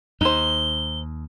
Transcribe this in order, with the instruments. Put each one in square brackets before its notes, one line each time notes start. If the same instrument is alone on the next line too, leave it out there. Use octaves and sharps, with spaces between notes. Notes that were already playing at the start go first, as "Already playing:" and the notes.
[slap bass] D#2 [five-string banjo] D#4 C5 [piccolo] G7